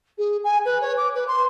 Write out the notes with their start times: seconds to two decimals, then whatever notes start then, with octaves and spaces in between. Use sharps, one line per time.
0.18 G#4
0.43 G#5
0.65 B4
0.81 C#5
0.97 D6
1.14 B4
1.27 C6